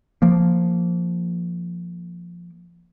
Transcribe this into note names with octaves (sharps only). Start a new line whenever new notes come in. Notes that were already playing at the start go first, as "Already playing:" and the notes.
F3 A#3